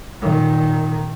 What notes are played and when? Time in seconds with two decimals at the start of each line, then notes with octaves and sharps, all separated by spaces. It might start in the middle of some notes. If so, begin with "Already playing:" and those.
0.21 A#2 D#3